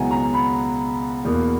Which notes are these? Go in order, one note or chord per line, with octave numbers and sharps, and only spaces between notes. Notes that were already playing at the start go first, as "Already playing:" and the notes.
Already playing: C#2 B2 F#3 B3 E4 F#5 G#5 A#5
A#5
B5
E2 B2 A#3